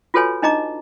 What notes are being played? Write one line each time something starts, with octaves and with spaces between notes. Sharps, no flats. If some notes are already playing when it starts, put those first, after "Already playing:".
F4 F#4 A4 B4 C#5 G#5
D4 D#4 D#5 A#5 D6